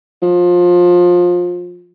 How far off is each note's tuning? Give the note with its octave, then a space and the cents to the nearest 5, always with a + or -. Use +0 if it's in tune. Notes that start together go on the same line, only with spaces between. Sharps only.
F3 +20